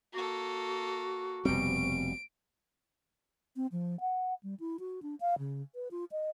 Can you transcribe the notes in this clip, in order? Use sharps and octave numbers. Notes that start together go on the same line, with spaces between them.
A#3 F#4 A4
F1 B2 G3 C4 D7
C4
F3
F#5
G3
E4
F#4
D4
F5
C#3
B4
F4
D#5